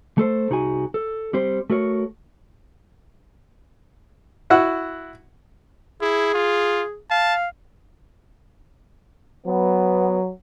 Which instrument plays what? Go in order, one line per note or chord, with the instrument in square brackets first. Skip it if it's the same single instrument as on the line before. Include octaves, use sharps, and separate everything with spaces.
[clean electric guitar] A3 A4 C5
C2 D#4 F#4 G#4 G#5
A4
G3 C4 G4 C5
A3 F#4 A#4 C#5
[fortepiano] E4 F#4 F#5
[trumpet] E4 [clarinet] G#4
[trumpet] F4
[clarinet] F5 [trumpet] A5
[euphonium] F#3 [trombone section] B3